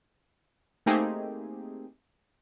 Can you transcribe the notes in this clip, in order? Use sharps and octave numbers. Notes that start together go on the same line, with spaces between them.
A3 A#3 C4 D#4 G4 G#4